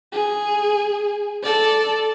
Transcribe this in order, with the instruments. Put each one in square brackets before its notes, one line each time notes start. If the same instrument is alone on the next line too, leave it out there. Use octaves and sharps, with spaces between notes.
[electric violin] G#4
A4 D5